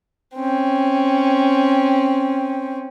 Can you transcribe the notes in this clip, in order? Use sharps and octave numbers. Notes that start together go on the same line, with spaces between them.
C4 C#4